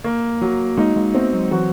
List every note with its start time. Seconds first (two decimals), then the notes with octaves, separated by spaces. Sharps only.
0.04 A#3
0.41 F#3
0.77 G#3 A#3 D#4
0.96 G#3 A#3
1.14 A3 B3 C4
1.33 F#3 G#3
1.51 E3 F#3 F#4